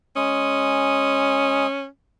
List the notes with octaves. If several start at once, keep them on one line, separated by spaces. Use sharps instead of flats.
G#3 C#4 D#6